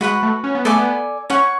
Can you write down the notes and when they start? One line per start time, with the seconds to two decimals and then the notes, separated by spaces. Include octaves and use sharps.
0.01 G#3 F#4 B4 F#5 B5
0.23 A3
0.44 C#4
0.55 B3
0.65 A3 A4 D5 G#5 D6
0.76 B3
1.30 C#4 C#5 F#5 C#6